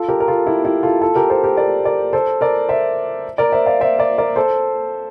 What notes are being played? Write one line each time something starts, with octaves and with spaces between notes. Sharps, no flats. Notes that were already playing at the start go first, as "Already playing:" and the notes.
Already playing: F4 A4
G4 A#4
A#4
F4 A4
E4 G4
E4 G4
F4 A4
F4 A4
G4 A#4
A4 C5
G4 A#4
A#4 D5
A#4 D5
A4 C5
A#4 D5
C5 E5
A#4 D5
C5 E5
D5 F5
C5 E5
A#4 D5
A#4 D5
A4 C5